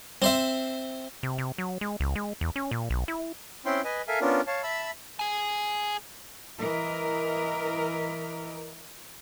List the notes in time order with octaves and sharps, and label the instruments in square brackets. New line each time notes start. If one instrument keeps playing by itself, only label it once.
[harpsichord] C4 C5 E5
[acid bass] C3
C3
F#3
G#3
C#2
G#3
E2
C#4
A#2
B1
E4
[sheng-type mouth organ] C4 C#4 E4 G5 C6
B4 D#5 G#5
A4 A#4 E5 F5 G#5
B3 C#4 D4 F4 A#4
C#5 F5 A5
E5 A5 B5 E6
[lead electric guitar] G#4 G#5
[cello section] E3 A#4 D#5